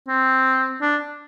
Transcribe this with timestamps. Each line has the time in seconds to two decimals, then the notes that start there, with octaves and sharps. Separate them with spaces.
0.08 C4
0.81 D4